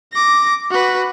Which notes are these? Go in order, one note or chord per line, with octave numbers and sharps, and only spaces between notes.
D6 A#6
F#4 B4